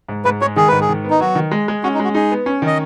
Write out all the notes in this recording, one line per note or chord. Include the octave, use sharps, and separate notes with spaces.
G#2
G#2 B4
G#3 C#5
D#3 G#4
G#2 B4
G#4
D#3
B3
D#4
F#3 F#4
D#3
G#3
G#3
C#4 F#4
D#4
G#3 F#4
D#4 G#4
B3
C#4
D#3 D#5